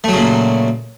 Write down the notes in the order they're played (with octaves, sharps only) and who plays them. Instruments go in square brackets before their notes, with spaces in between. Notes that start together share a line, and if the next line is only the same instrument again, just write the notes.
[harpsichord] A3
F#3
C#3
A#2